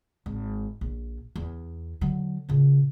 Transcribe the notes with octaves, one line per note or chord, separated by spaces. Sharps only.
G#1
A#1
E2
D3 F#3
A#2 C#3